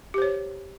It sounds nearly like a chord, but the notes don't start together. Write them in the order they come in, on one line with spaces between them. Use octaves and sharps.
G4 C5 C#5